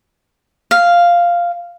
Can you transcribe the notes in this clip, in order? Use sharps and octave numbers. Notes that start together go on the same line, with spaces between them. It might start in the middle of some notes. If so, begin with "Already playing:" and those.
F5